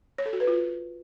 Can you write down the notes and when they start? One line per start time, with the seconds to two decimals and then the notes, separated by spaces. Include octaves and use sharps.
0.18 C#5
0.26 A4
0.33 F#4
0.40 B4
0.47 F4